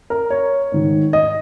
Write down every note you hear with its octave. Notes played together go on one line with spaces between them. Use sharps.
A#4
C#5
G#2 D#3
D#5